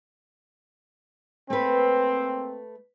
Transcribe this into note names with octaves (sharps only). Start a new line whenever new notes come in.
A3 A#3 C4 B4